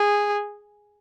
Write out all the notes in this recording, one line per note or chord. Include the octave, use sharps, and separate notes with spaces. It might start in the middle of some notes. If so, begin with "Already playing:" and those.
Already playing: G#4